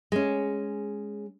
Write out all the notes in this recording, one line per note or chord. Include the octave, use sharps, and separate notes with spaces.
G#3 C#4